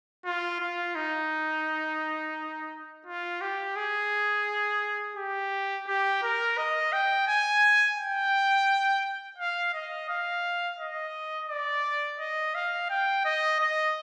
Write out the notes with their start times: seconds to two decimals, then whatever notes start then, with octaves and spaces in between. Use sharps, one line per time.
0.25 F4
0.60 F4
0.95 D#4
3.06 F4
3.41 G4
3.76 G#4
5.17 G4
5.87 G4
6.23 A#4
6.57 D#5
6.93 G5
7.28 G#5
7.98 G5
9.38 F5
9.74 D#5
10.09 F5
10.79 D#5
11.49 D5
12.19 D#5
12.55 F5
12.90 G5
13.25 D#5
13.60 D#5